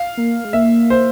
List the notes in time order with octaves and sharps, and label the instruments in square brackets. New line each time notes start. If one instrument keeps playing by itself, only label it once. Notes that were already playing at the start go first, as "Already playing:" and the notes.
Already playing: [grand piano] F5
[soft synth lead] A#3
G#3
[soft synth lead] A#3 [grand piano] E5
[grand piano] C5